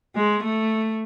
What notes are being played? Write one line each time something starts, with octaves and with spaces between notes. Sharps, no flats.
G#3
A3